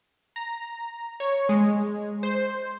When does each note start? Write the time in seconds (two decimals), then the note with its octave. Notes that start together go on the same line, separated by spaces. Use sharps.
0.36 A#5
1.20 C#5
1.49 G#3
2.23 C5